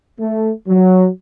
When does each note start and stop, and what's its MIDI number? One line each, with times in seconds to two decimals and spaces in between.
0.20 0.51 57
0.68 1.08 54